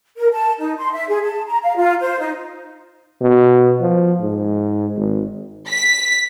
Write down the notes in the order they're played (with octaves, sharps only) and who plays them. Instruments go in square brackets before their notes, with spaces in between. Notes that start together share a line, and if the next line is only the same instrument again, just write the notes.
[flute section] A#4
A5
D#4
C6
E5
G#4
A5
A#5
F5
F4
C5
D#4
[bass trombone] B2
F3
G#2
G#1
[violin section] B6